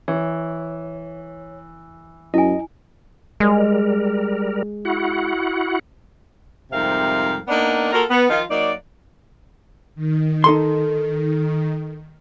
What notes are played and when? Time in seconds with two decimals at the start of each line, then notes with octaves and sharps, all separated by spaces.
0.08 E3 C#5
2.34 F#2 E4 D#5 G#5
3.40 G3 G#3 A#4
4.85 E4 F#4 F#5
6.72 F2 G#2 C3 G3 A#4 F5
7.48 A#3 B3 D4 D#4 D5
7.92 A#3 F4 F#4 A4 A#4
8.09 B3
8.29 D#3 F3 D#4 F4
8.50 F#3 A#3 D#4 D5
9.96 D#3
10.44 D#4 A4 C6